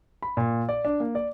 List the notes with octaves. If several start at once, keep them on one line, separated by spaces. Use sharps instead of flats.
B5
A#2
D5
D4
A#3
D5